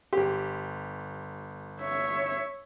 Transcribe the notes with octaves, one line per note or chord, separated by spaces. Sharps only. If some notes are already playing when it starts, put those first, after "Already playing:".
G1 G4 C6
C#5 E5